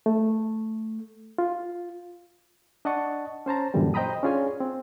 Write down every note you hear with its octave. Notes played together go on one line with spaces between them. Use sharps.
A3
F4
D4 D#5 F#5 A5 C#6
C#4 C5 A5 A#5
F#2 A#2 D3 E3 G3
C5 D#5 G5 A#5 B5 D#6
C#4 D4 F4 G#4 C#5 G#5
C4